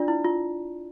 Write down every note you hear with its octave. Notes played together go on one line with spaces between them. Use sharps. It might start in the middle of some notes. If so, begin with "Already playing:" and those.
Already playing: D4 F4 D5
E4
F4